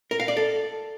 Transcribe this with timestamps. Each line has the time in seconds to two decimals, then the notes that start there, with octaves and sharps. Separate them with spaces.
0.11 A#4
0.20 F5
0.28 D5
0.37 A4